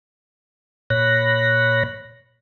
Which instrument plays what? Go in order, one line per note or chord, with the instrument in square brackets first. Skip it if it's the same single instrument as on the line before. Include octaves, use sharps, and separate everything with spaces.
[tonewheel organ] A#2 C#5 B5 F#6 A#6